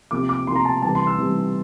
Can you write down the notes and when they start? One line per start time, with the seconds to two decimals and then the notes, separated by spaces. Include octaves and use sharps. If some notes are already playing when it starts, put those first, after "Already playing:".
0.11 C3 F3 A#3 D6
0.29 D6
0.47 C3 F3 A#3 C6
0.56 A#5
0.65 A5
0.82 C3 E3 G3 A5
0.95 C6
1.07 E6
1.18 C3 E3 G3